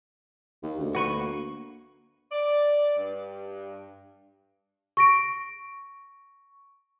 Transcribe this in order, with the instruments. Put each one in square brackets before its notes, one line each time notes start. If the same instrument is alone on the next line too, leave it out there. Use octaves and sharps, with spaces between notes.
[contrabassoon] D#2
D2
[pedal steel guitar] F#4 B4 C#6
A#3
[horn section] D5
G2
[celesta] C#6 A#6 D7